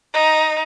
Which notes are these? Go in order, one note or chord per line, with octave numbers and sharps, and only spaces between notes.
D#4